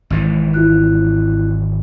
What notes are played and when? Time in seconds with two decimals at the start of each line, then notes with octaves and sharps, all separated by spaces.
0.10 G#1 G#2 E3
0.54 E4 F4 F#6